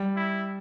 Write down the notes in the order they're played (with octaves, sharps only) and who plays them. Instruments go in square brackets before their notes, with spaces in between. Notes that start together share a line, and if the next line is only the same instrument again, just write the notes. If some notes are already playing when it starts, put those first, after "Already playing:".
Already playing: [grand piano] G3
[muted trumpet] E4